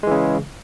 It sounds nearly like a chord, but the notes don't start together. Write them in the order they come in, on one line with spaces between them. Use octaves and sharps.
G#3 E3 C#3